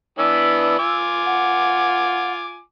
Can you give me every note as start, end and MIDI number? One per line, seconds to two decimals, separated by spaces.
0.18 0.78 52
0.18 0.78 59
0.18 0.78 62
0.18 0.98 88
0.79 2.61 65
0.79 2.61 80
0.79 2.61 86
1.25 2.32 78